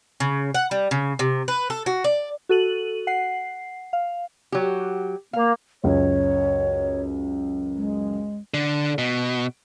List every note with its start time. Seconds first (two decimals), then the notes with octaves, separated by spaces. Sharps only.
0.20 C#3
0.54 F#5
0.71 G3
0.91 C#3
1.19 C3
1.48 B4
1.70 A4
1.86 F#4
2.04 D5
2.49 F#4 A4 D#7 F#7
3.07 F#5 C7
3.93 F5
4.52 F#3 G4
5.33 A#3 F5
5.84 C#2 F#2 C#5
7.76 G#3
8.54 D3
8.98 B2